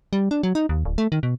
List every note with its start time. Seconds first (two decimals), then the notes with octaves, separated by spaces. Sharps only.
0.13 G3
0.31 D4
0.43 F#3
0.55 D#4
0.69 D#2
0.85 D1
0.98 A3
1.12 D#3
1.23 B2